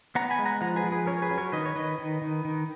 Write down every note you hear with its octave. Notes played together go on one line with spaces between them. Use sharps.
B3 F#5 A#5
G#5 B5
G#3
F#5 A#5
F3 F#5 A#5
G#4 B4
F3
G#4 B4
C#4 A#4 C#5
G#4 B4
F#3
A#4 C#5
D#3 B4 D#5
C#5
D#3 B4 D#5
D#3
D#3
D#3